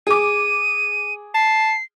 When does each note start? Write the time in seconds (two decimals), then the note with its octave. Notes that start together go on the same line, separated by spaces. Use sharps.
0.07 G#4 D6 D#7
1.34 A5 C7